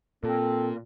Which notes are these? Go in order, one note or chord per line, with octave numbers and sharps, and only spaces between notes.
A#2 C4 A4